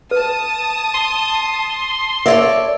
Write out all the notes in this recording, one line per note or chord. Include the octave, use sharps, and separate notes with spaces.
B4 A5 D#6
C6
A4 A#4 C#5 D5 E5